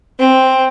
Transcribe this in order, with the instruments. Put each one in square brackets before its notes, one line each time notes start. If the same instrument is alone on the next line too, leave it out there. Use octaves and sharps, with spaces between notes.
[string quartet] C4